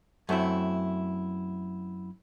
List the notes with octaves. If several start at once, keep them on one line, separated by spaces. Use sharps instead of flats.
F#2 A3 C4 E4